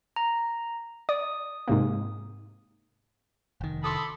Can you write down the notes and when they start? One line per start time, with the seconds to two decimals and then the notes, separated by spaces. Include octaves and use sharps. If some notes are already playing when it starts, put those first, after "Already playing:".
0.16 A#5
1.09 D5 D#6
1.68 G#2 C3 A#3
3.61 F1 D#3
3.84 A4 B5 C6 D6 D#6